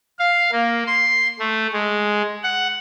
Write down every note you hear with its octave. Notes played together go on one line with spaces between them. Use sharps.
F5
A#3
C6
A3
G#3
F#5